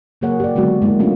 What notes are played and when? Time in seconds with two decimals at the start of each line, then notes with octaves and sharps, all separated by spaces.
0.21 C#3 F#3 A#3 G#4 C#5 F#5
0.40 G4 G#4 D5
0.55 D3 F#3 G#3 B3 F#4
0.82 G#3 A#3 E4
0.99 F#3 A3 B3 C#4 D4 F4